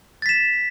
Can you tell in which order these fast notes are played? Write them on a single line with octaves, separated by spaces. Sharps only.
A6 B6 E7